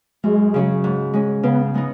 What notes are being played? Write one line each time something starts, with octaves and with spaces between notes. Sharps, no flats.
F#2 G#3
C#3 F#3 C#4 G#4
G#2
G#3 C#4
C#3 B3
G#3 B3 D#4